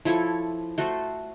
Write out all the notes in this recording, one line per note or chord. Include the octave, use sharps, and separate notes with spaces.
F3 E4 A4 C#5
A3 F#4 A4 C5